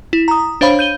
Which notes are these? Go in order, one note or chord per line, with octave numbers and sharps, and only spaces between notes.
E4
A#5 D#6
D4 C5 C#5 F5 B5
G6 D#7 G7